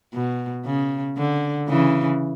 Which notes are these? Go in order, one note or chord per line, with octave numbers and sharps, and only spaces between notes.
B2
C#3
D3
C#3 E3